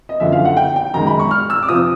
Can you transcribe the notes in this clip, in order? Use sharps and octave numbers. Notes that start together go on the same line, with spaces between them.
D#5
F#1 F#2 D3 F3 E5
F5
F#5
G5
G5
F#2 D#3 G#3 A#5
B5
C#6
F6
E6
D6
F2 C3 F3 D#6